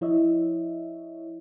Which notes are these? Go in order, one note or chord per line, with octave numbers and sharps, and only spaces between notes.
F3 E4 C#5 D#5 E5